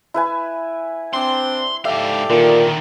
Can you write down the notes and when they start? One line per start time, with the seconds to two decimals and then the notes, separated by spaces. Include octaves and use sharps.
0.14 E4 B4 G#5
1.13 C4 D4 C6
1.85 G#2 G4 A4 D5 E5 F5
2.30 A#2 D3 D#3